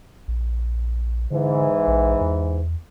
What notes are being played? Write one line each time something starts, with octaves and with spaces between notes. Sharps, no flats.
A#1
G#2 D3 E3
A#1
E2